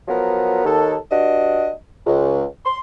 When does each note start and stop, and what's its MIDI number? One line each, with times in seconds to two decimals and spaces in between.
0.08 0.64 53
0.08 0.64 54
0.08 0.64 59
0.08 0.64 70
0.65 0.95 39
0.65 0.95 69
1.11 1.70 43
1.11 1.70 62
1.11 1.70 66
1.11 1.70 75
2.06 2.44 37
2.66 2.79 84